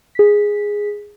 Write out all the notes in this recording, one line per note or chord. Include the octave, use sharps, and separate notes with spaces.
G#4 B6